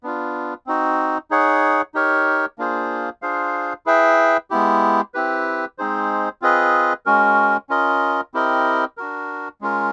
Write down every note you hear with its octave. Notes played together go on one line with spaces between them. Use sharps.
B3 D4 F4
C4 D#4 F#4
D#4 G#4 C#5 F#5
D#4 G4 A#4 C#5
A#3 D4 F4 G#4 C5
D4 F4 G#4 C5 F5
E4 G#4 B4 E5 G5
G#3 B3 E4 G4
C4 E4 G4 B4
G#3 C4 D#4 G#4 C5
C4 F4 G#4 B4 D#5
G#3 C#4 F#4 A#4
C#4 F4 A#4 D#5
C4 E4 G4 A#4 D#5
D4 F#4 A#4
G#3 C#4 F4 A#4